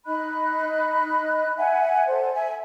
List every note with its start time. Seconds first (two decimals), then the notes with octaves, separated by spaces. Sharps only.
0.06 D#4 D#5 B5 F#6
1.57 E5 F#5 G#5
2.07 A4 C5 D5
2.32 E5 G#5